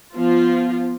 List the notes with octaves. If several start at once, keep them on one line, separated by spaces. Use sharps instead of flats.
F3 B3 F4